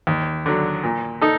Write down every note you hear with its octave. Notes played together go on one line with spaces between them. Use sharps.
D#2
D3 F#3
A#2
D#4 A4